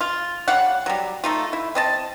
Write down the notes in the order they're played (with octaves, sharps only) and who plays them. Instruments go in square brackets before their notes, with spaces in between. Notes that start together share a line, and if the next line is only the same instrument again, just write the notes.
[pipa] F4
G3 C#5 F5 F#5
F#3 G3
A3 D#4 F4
E4
C4 D#5 A5